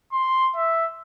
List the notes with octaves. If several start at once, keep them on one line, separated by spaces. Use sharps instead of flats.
C6
E5